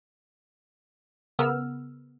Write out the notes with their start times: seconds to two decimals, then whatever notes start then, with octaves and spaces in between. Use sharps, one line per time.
1.39 C#3 B3 A#4 E6 F6